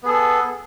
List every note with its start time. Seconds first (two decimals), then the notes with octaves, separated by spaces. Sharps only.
0.03 B3
0.05 G#4
0.08 A4